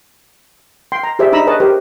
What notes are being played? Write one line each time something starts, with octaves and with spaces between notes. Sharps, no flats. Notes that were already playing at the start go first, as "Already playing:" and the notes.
G5 C6
A#5
G4 G#4 C5 D5 E5
D4 D#4 A#5 B5 E6
G#4 B4 C#5 D#5 A5
G4 A#4 C5